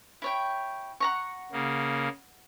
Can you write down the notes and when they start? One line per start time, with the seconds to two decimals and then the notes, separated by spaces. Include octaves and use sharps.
0.22 E4 C#5 G5
1.00 F#5 A#5 C#6
1.52 C#3 A#3